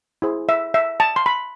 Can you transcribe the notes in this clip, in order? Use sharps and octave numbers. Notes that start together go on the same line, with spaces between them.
E4 G#4 C5
E5
E5
A5
C6
B5